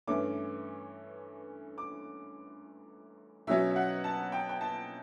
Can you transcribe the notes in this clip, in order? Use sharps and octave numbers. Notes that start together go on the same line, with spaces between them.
G2 E3 A3 C#4 D6
D6
B2 F#3 C#4 E5
E5
F#5
A5
G5
G5
A5